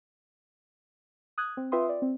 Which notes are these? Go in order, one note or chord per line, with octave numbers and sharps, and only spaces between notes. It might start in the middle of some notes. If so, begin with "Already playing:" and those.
D#6 F#6 G#6
C4
F4 B4 E5 G5 C6 D#6
D5
C4